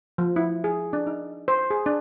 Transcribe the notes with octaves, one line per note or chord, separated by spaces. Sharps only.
F3
E4
G#4
D4
D#4
C5
G#4
D4